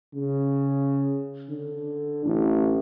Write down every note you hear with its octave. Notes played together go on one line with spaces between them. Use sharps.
C#3
D3
A1